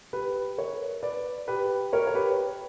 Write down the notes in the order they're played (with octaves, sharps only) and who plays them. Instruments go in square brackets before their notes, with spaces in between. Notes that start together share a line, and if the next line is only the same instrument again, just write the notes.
[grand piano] G4 B4
A#4 C#5
B4 D5
G4 B4
A#4 C#5
C#5
G4 B4